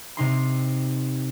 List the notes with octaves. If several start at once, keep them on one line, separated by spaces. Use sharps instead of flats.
C3 D#4 C6